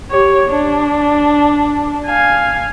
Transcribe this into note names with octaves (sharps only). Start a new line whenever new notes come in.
G4 C#5
D4
F5 G#5